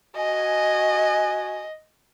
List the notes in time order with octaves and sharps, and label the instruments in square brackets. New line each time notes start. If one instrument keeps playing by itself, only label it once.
[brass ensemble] F#4 G#5 [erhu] D#5